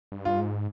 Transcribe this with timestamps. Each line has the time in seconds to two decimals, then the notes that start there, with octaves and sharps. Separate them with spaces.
0.12 G2
0.25 F4
0.39 G#2